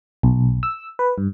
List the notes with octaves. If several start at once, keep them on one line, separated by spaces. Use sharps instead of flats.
B1
E6
B4
G2